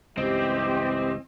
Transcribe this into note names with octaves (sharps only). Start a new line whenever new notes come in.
C#2 G2 E3 C4 G4 D#5